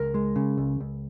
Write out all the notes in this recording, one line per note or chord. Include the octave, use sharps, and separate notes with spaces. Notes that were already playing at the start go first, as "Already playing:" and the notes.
Already playing: C#2 A#4
G#3
C#3
C#2
C#2